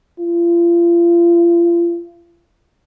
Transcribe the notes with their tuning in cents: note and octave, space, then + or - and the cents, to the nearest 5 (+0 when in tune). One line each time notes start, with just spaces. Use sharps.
F4 -35